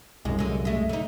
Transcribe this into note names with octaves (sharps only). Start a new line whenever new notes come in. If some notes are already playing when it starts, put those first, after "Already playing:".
C2 F#2 G#3
D3 G#3
G#3 A3
D3 D#4